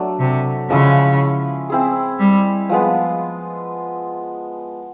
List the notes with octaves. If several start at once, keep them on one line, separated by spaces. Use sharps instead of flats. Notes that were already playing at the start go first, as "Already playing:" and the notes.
Already playing: F#3 A3 D4
C3
C#3 F3 G#3 C#4 E4
C4 E4 G#4
G3
F3 G#3 B3